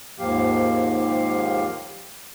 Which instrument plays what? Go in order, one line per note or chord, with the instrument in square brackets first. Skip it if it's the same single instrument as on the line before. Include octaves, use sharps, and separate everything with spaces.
[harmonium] D#2 G#2 F3 A#3 G4 F5